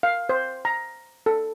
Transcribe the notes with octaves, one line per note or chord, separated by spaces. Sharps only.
F5
C5
A#5
A4